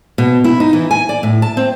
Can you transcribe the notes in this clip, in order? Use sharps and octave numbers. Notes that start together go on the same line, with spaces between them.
B2
E4
D#4
E3
G#5
D5
A2
A5
C4